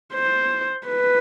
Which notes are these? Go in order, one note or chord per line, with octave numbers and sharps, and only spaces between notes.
C5
B4